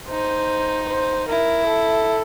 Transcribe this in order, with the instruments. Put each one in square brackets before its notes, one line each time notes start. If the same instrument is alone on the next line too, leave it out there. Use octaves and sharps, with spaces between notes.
[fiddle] D#4 [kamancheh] C5
[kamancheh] C5
[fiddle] E4 [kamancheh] A#4
[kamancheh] A4